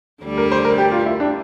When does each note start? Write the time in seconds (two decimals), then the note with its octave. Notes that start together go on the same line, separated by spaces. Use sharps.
0.24 D2 D3 G3 D4
0.38 A#4
0.51 C5
0.65 A#4
0.78 G4
0.92 F4
1.06 E4
1.20 D4